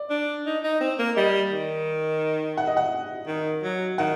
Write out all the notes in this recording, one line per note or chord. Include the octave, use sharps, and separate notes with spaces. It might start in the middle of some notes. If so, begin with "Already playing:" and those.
Already playing: D5
D4
D#4
D#4
C4
A#3
G3 D#5
D#3
F#5
D#5
F#5
D#3
F#3
D#3 F#5